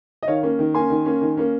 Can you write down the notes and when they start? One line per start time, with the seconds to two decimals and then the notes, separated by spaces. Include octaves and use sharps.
0.23 D#5
0.28 D#3 C#5 F5
0.43 A#3 C#4
0.59 D#3
0.74 A#3 C#4 G#5 C6
0.90 D#3
1.06 A#3 C#4
1.21 D#3
1.37 A#3 C#4